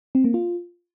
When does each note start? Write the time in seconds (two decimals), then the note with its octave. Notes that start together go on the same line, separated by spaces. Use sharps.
0.15 C4
0.24 A#3
0.34 F4